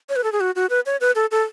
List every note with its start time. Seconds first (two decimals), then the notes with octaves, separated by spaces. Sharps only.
0.09 C#5
0.16 B4
0.24 A4
0.32 G#4
0.40 F#4
0.56 F#4
0.70 B4
0.86 C#5
1.01 B4
1.15 A4
1.31 A4